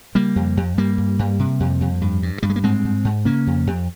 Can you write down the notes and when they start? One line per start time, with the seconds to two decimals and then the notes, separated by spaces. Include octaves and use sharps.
0.15 C#3 G3 A#3
0.36 F2
0.57 F2
0.77 G2 G3 A#3
0.98 G2
1.19 G2
1.39 C3
1.60 F2
1.81 F2
2.02 G2
2.23 G2
2.43 G2 G3
2.50 G#3
2.56 A#3
2.63 G#2 G#3 C4
2.84 G#2
3.05 G#2
3.25 C#3 A#3 C#4
3.47 F2
3.67 F2